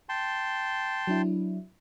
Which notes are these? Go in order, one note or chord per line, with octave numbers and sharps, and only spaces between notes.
G5 A5 C6
F#3 D4 E4